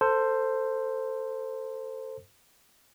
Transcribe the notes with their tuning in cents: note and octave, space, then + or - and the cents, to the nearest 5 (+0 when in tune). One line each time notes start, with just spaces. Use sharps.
A4 +20 C5 +0